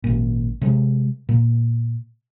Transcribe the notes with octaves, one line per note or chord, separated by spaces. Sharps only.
G#1 A#2
C3 G#3
A#2